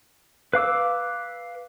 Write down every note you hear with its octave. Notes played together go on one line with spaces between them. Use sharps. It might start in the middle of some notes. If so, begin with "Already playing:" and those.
B4 F5 D6 E6